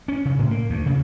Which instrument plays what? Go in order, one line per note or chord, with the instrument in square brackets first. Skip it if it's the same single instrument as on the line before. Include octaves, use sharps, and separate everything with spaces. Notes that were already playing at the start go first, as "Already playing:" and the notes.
[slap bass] C#4
C#3
A2
A#3
D2
C#3